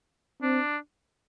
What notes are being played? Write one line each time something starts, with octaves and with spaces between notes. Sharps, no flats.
C4 D4